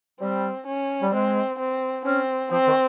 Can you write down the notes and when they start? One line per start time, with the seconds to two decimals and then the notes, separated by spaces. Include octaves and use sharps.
0.20 G3 C4
0.67 C#4
1.02 G3
1.12 G#3 C4
1.59 C4
2.05 C4 C#4
2.51 F3 C4
2.67 D#3